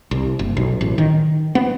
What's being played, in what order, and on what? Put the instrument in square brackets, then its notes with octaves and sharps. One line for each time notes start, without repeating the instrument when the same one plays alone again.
[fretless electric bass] C2
F#1
B1
A1
D#3
B3